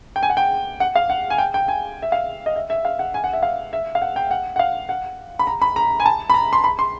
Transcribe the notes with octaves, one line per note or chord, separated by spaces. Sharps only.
G5
G#5
F#5
G5
F#5
F5
F#5
G#5
G5
G5
G#5
E5
F5
D#5
E5
E5
F5
F#5
G#5
F#5
E5
F5
E5
F5
F#5
G5
F#5
F#5
F5
F#5
B5
A#5
B5
A#5
G#5
A5
B5
A#5
C6
B5
C6